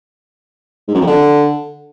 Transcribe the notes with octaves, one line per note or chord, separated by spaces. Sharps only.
G#2
F#2
F2
D3